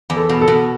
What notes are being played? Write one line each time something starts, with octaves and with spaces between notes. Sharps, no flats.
E2
A4
B2
A4
B2